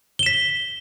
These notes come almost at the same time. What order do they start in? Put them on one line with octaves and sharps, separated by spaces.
G7 E7 B6